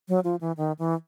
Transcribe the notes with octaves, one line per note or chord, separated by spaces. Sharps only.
F#3
F3
E3
D#3
E3